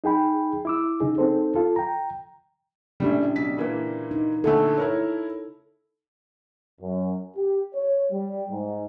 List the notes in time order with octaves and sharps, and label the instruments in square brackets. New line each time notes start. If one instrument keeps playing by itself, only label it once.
[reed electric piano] D#4 G#4 G5 B5
E4 D6 E6
C#3 D#4 G#4
C4 D#4 A4 C5
F4 A4
G5 A#5
[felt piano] A#1 A2 G3 [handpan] C#3 D4 G4
[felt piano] B1 B6
A#2 E3 A#3
[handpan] D#4
[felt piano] A#1 D3 A3 [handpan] A4
[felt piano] E4 A#4 C#5
[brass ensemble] F#2
G4
C#5
G3
G#2